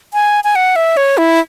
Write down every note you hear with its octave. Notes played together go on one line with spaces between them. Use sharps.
G#5
G#5
F#5
E5
C#5
E4